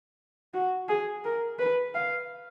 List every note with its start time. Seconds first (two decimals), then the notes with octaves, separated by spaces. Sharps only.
0.54 F#4
0.89 G#4
1.25 A#4
1.59 B4
1.95 F5